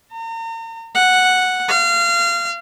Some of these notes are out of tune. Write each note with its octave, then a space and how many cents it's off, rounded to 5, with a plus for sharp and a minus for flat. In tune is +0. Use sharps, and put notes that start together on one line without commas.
A#5 -40
F#5 -5
F5 -25